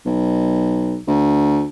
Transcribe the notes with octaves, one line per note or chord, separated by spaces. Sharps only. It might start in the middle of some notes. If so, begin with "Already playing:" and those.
B1
D2